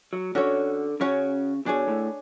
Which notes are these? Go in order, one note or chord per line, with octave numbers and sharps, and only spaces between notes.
F#3
D3 C#4 F#4 C#5
C#3 C#4 F#4 C#5
B2 D4 G#4 C#5
A2